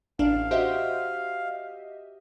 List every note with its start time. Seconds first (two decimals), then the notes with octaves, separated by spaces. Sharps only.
0.19 A1 D4 F5
0.51 F#4 G4 C5 D#5 E5